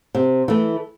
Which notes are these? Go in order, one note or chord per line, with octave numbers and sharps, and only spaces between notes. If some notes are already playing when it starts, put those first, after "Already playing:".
C3
E3 A3